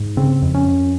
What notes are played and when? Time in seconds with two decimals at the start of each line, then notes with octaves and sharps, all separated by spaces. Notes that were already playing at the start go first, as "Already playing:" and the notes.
Already playing: G#2
0.17 C#3 C4
0.42 F2
0.55 C#4
0.67 F2